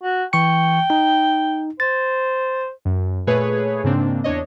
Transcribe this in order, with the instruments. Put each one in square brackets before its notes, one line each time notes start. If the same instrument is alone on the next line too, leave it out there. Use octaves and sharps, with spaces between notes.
[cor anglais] F#4
[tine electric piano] E3 C#6 C#7 [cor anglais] G5
[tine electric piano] D#4
[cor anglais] C5 [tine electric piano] A6
[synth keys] F#2
A#2 A3 G#4 B4 C#5
G#2 C#3 A#3 C4 D4
E2 D4 C#5 D#5